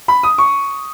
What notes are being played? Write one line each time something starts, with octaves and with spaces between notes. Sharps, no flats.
B5
D#6
C#6